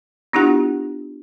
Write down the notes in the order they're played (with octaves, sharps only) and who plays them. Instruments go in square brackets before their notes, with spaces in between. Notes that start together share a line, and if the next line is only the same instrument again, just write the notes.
[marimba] B3 D4 E4 F4 G4 F#5